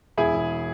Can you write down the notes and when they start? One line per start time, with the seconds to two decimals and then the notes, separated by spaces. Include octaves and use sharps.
0.17 E1 E4 G#4
0.34 E1